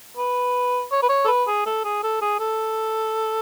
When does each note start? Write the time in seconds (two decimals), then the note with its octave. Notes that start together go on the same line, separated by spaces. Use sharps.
0.17 B4
0.92 C#5
1.03 B4
1.09 C#5
1.25 A4
1.28 B4
1.47 G#4
1.66 A4
1.84 G#4
2.03 A4
2.22 G#4
2.40 A4